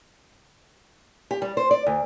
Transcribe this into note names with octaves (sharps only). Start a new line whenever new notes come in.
G4
G3
C5
D5
D2